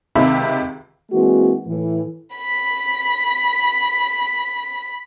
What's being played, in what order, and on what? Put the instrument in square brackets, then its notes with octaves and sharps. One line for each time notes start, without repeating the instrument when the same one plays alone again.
[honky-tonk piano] C#2 C3 D#3 G4 E5 B5
[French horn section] E3 G#3 A#3 C4 F#4
A2 E3
[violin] B5 B6